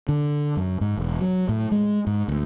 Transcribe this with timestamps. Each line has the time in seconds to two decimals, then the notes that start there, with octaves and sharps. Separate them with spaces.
0.09 D3
0.57 F#2
0.81 G#2
0.97 E1
1.21 F#3
1.49 A2
1.72 G#3
2.07 G#2
2.28 D2